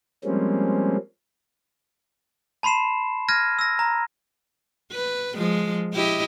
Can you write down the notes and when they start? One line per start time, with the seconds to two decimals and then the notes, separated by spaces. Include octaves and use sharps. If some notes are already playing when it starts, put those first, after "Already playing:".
0.24 F3 G3 G#3 A#3 C4 C#4
2.63 A5 B5 C6 C7 E7
3.28 F6 G#6 A#6 D#7
3.59 E6 A#6
3.79 A#5
4.92 B4
5.36 F3 G#3
5.93 E4 G4 D#5